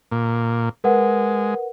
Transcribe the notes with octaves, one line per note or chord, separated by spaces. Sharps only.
A#2
G#3 A#4 B4 F#5